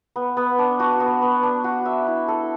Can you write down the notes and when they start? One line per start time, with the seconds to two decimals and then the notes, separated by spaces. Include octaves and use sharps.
0.16 B3
0.37 B3
0.59 D4
0.80 F#4
1.00 B3
1.22 B3
1.43 D4
1.64 F#4
1.85 E5
2.07 E4
2.28 A4